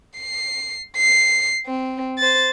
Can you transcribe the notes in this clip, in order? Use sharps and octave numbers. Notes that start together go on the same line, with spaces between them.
C7
C7
C4
C5 A6